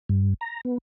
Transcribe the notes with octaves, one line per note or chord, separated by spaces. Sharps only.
G2
A#5
B3